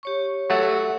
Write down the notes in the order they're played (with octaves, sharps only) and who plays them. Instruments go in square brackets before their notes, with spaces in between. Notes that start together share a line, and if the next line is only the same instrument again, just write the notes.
[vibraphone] G4 C#5 C#6
[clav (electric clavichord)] F#3 A3 [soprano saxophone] F#4